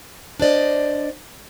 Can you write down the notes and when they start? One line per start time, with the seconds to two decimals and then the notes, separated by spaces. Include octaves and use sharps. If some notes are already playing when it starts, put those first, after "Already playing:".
0.40 D4 C5 D5 D#5